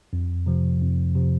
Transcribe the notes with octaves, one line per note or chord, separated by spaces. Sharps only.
F2
C3 F3
F2
C3 F3